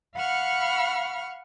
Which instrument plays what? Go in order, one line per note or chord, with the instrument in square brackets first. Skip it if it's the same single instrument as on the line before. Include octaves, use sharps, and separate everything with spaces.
[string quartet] F5 F#5 B5 C#6 F6